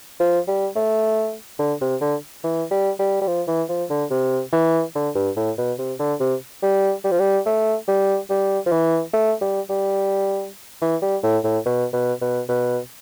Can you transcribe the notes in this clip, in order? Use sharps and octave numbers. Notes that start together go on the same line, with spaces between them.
F3
G3
A3
D3
C3
D3
E3
G3
G3
G3
F3
E3
F3
D3
C3
E3
D3
G2
A2
B2
C3
D3
C3
G3
G3
F3
G3
A3
G3
G3
F3
E3
A3
G3
G3
E3
G3
A2
A2
B2
B2
B2
B2